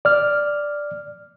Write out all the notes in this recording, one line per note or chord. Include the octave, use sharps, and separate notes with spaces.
D5 F6